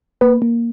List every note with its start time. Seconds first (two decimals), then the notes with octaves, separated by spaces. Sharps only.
0.21 A#3 B4
0.42 A#3